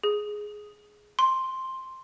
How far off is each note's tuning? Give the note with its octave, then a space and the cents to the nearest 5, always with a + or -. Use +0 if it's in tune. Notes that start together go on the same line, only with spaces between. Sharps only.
G#4 +5
C6 +5